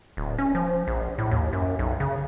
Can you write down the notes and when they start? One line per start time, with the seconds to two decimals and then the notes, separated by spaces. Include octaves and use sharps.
0.17 D1
0.38 C#4
0.55 F3
0.87 A#1
1.18 A2
1.31 D#2
1.53 F#2
1.79 B1
2.00 C#3